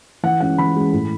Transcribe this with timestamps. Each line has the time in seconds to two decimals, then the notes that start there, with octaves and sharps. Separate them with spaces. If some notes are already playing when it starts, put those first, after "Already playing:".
0.23 E3 F#5
0.40 G#3 C#4 F#5
0.58 E3 B5
0.76 G#3 C#4
0.93 A2